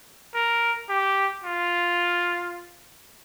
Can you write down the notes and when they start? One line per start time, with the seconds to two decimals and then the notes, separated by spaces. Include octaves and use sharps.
0.35 A#4
0.89 G4
1.44 F4